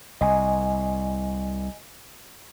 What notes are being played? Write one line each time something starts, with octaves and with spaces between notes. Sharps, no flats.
C2 D#5 G#5